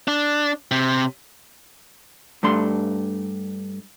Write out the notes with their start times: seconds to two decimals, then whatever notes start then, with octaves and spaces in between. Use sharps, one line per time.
0.08 D4
0.71 C3
2.43 G2 A3 D4 C6